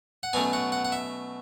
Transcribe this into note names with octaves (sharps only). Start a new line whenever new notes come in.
F#5
B2 F#3 A3 C#4 G#5
F#5
F#5
F#5
E5